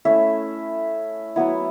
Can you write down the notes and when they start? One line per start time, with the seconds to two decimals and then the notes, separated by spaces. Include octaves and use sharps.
0.05 A3 C#4 E4 E5
1.36 F#3 B3 E4